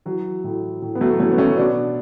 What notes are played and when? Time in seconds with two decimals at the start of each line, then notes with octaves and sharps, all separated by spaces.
0.06 E3 F#3
0.44 A2
0.82 A2
0.95 B3
1.01 F#3 A3
1.20 E3 A3 C#4
1.32 B3
1.38 A3 C#4
1.57 B2 B3 D4